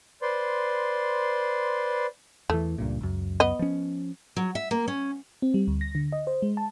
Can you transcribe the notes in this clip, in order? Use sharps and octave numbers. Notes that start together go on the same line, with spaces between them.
B4 C5 D5 C6
E2 E3 A3
C#2 G2 A#2
C#2 F#2
B3 D#5
F3 C#4
F#3
E5
A#3
C#4
C4
G3
D2
A#6
D3
D#5
C5
G#3
A5